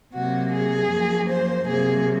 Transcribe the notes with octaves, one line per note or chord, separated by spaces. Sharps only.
C3 F#3 A#3 F#4
G#4
F#2 F3 A#3
C5
C3 F#3 A#3 G#4